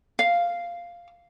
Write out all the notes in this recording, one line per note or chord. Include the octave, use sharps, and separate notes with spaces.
F5